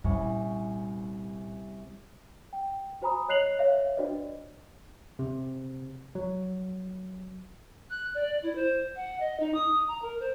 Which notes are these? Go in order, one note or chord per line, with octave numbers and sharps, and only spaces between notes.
C2 A#2 C#4
G5
F#4 C5 G#5 A#5 B5 D#6
C#5 D#5 F#6 C7 F7 F#7
C#5 E5 F5
D4 F#4 B4 C5 D5 D#5
C3
F#3
F#6
D5
E4
C5
F#5
D#5
D#4
D#6
A#5
A#4
C5